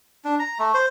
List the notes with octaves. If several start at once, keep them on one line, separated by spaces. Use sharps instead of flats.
D4
A#5
A3
C5